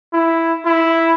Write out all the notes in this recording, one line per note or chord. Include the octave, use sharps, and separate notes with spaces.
E4
E4